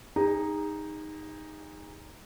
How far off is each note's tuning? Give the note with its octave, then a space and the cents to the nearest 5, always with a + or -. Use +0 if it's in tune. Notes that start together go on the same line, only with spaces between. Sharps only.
D#4 +0 G#4 -40